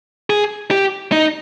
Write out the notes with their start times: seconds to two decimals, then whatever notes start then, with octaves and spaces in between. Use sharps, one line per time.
0.30 G#4
0.71 G4
1.12 D#4